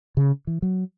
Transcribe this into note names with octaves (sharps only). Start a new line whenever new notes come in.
C#3
E3
F#3